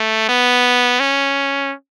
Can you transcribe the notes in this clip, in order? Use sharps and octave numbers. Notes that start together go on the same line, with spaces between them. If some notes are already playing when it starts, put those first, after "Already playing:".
Already playing: A3
B3
C#4